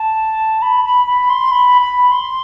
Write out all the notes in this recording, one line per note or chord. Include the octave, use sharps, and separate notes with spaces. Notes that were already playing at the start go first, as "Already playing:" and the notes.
Already playing: A5
B5
B5
B5
C6
B5
B5
C6